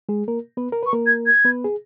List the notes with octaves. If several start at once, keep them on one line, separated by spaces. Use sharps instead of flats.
G#3 G#4
A#3 A#4
B3 B4
A#4
B4 C#6
A#3 A#4
G#6
G#6
B3 B4
G#4